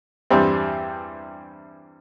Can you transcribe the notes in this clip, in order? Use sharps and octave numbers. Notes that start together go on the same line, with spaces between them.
E2 G2 G3 C4